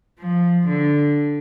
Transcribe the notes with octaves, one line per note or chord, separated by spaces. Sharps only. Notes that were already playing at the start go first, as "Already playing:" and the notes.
F3
D3